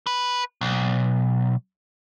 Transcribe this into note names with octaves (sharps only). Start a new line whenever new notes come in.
B4
B1